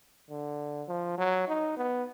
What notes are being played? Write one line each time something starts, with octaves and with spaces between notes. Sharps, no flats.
D3
F3
F#3
D#4
B3